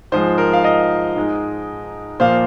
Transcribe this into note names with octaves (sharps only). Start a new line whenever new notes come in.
G#2 F3 G#3 C5
A#4
F5
A#4 D#5
G#2 G#3 D#4
A#2 F3 A#3 C5 F5